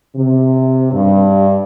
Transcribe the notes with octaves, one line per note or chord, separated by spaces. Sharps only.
C3
G2